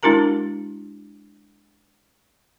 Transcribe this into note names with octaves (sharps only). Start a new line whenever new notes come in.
G#3 D4 E4 F#4 A#4 A#5